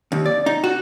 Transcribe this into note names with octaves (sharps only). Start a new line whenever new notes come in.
D#2
D5
D#4
F#4